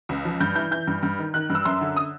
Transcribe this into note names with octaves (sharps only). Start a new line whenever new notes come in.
C#2
F3
G2 G6
E3 G6
E3 G6
G2
G2
D#3
D#3 F#6
G2
E6
F#2 C6
D3
D#6